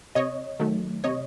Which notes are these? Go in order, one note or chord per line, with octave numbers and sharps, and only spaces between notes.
C3 C#5 D#5
D#3 F#3 A3
C3 C#5 D#5